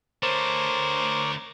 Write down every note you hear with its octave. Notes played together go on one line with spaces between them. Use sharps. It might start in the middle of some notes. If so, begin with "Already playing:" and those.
D3 A3 A#4 C5 C#5 D6